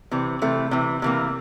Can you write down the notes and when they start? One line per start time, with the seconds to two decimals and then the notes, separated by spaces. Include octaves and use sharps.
0.11 C3 E3
0.42 C3 E3 A3
0.71 C3 E3
1.02 C3 E3 A#3